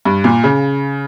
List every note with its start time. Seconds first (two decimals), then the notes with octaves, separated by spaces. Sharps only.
0.05 G2
0.24 A#2
0.44 C#3